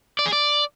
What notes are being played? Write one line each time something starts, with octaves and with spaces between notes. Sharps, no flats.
D5
G#4
D5